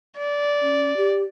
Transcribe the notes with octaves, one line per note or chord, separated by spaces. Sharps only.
D5
C#4
G4